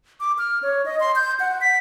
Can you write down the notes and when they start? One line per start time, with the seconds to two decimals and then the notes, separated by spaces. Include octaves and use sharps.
0.20 D6
0.38 F6
0.63 C#5
0.85 D#5
1.00 C6
1.16 G6
1.40 F#5
1.61 B6